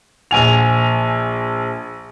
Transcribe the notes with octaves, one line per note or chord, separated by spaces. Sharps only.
A#1 G#5 F7